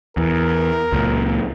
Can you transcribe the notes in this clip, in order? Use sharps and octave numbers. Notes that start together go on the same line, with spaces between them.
E2 A#4
C#2 A#2